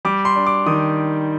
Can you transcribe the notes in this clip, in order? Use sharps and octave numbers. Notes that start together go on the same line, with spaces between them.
G3 D6
C6
D4
D6
D#3 D#6